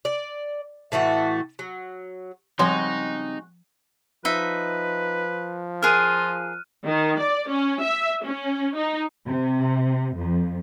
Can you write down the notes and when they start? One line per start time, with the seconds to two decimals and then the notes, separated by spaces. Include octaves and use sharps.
0.05 D5
0.92 A2 E3 A3 F#4
1.59 F#3
2.59 C#3 F3 G3 G#3 C4 D#4 F#4 C6
4.25 F3 D#4 B4 E5
5.83 F4 G#4 A#4 F6 F#6 D#7
6.86 D#3
7.18 D5
7.50 C#4
7.81 E5
8.24 C#4
8.75 D#4
9.28 C3
10.15 F2